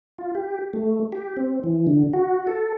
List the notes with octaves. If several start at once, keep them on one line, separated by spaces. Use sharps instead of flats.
F4
G4
A3
G4
C4
E3
D3
F#4
A4